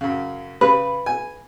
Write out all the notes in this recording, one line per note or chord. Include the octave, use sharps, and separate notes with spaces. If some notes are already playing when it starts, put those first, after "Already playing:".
F#2 C#3
C#3 B4
G#5